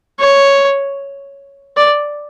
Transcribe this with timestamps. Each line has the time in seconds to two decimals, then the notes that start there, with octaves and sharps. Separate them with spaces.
0.19 C#5
1.76 D5